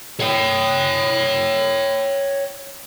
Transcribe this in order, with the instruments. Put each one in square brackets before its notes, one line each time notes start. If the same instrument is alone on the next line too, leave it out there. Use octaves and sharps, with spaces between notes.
[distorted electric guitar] C#5 G5